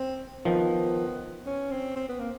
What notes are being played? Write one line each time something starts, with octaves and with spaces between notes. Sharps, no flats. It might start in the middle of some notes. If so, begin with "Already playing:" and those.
Already playing: C4
D#3 F3 B3
C#4
C4
C4
B3
A#3